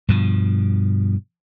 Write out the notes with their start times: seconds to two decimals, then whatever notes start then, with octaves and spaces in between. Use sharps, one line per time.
0.09 G2 B2 F3